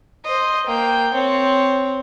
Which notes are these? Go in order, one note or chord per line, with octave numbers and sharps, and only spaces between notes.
C5 D#5
A#3 G5
C4 C#5